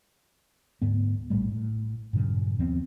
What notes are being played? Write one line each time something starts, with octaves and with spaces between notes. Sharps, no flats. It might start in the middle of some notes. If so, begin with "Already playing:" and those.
D2 G#2 B3
A#1 A2 G3 A3
A2
G2 A#2 C#3 F#3
D#2 F3 B3 C4